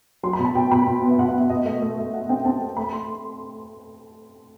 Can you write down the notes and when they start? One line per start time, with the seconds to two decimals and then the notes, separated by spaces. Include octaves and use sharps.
0.23 F#3 C6
0.33 B5
0.39 B2
0.45 A5
0.55 B2 G5
0.71 B2 B5
0.86 B2 C6
1.02 B3
1.10 E5
1.18 B2 F#5
1.29 F#5
1.35 B3 E5
1.50 B2 D#5
1.65 A3 D#5
1.82 A3 E5
1.98 A3
2.13 A3 F#5
2.29 C4 G5
2.45 C4 A5
2.62 A3
2.77 A3 B5
2.93 A3 C6